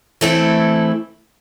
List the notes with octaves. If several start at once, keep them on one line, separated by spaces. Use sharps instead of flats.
E3 A3 C4 E4 A4